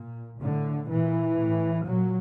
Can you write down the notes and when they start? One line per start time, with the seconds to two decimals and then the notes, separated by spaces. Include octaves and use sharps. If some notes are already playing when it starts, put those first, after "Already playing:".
Already playing: A#2
0.40 A2 D3
0.89 A#2 E3
1.37 A2
1.85 A#2 F#3